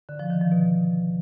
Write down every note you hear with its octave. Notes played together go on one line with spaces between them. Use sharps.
D3
F3
D#3
F3
B2